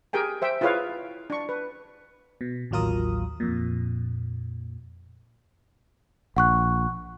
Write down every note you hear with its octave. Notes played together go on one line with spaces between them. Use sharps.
G4 G#4 A#4 G5 G#5
C5 E5 G5
E4 F4 G#4 B4 C#5 F5
D4 C#6
B4
B2
A1 D#2 F#3 F4 A#4 D#6
F2 A#2
A#1 F#5 C#6 F#6